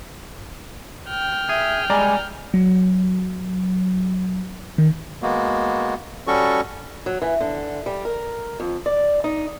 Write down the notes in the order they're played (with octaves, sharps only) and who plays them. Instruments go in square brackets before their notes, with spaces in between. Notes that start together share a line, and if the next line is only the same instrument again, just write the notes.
[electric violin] G5 F6
[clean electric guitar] G#4 [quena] E5
[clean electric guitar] G3 G#3 [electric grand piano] D5 A#5 [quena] G#5
[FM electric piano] F#3
D#3
[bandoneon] G#3 A#3 B3 F#4
G3 C#4 F#4 A4 C#6
[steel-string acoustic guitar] F#3
E3
D3
G3
A#4
F2
D5
D#4